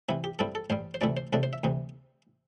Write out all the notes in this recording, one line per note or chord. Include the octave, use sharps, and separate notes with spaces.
C2 C3 E3 E4
G4
G2 G3 C4 E4 A4
A4
A1 G2 G3 C5
C5
D2 C3 E3 A3 E4 D5
C5
C2 C3 A3 D4 A4
C5
E5
D2 C3 E3